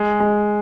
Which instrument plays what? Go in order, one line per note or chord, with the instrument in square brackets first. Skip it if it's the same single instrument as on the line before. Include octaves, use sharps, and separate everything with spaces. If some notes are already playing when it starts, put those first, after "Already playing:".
Already playing: [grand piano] G#3
G#3